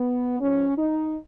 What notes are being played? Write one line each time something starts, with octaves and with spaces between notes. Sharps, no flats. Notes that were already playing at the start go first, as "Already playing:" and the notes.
Already playing: B3
G#2 F3 C#4
D#4